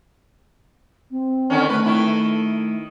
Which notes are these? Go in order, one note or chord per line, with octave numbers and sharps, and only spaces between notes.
C4
D3 D#3 C#4
A3 B4
D#3 E4